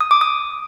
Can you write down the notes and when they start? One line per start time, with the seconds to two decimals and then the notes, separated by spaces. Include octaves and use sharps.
0.01 D#6
0.11 D6
0.21 D#6